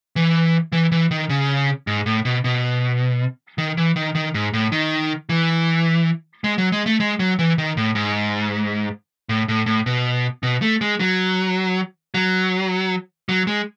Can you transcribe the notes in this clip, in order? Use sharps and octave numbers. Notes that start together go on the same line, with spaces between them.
E3
E3
E3
D#3
C#3
G#2
A2
B2
B2
D#3
E3
D#3
D#3
G#2
A2
D#3
E3
G#3
F#3
G#3
A3
G#3
F#3
E3
D#3
A2
G#2
A2
A2
A2
B2
B2
A3
G#3
F#3
F#3
F#3
G#3